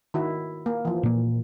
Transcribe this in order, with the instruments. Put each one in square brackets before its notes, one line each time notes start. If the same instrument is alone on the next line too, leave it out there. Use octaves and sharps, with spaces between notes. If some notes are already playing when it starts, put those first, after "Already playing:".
[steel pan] D#3 E4 F#4
A#3
E3 F3
[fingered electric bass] A#2 A#3